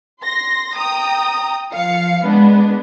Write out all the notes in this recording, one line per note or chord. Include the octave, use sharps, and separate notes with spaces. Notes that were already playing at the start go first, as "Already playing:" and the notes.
C6 A#6
G5 A#5 D#6
F3 F5 C#7
G#3 B3 D4